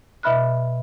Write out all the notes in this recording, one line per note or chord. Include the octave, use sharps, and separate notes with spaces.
B2 D#5 E5 B5 F6 F#6